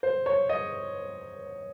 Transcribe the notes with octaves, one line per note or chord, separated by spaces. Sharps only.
C5
C#5
D#5